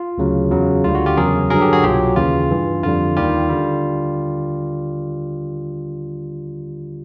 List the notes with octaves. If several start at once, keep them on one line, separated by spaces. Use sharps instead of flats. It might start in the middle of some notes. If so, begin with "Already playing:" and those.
Already playing: F4
D2 C#3 F#3
E2 C#3 F#3
D2 D3 G3 F4
F#4
F4 G4
E2 C#3 F#3 G#4 A#4
G2 D3 F#3 G#4 A#4
G4 A4
F#4 G#4
C2 B2 F#3 F4 G4
D#2 C#3 E3 F4
G2 E3 G3
F2 D3 G3 F4
D#2 D#3 G3 F4 G4
D3 G3